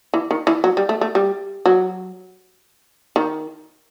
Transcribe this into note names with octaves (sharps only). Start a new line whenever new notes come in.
E3
D#3
E3
F#3
G3
A3
A3
G3
F#3
D#3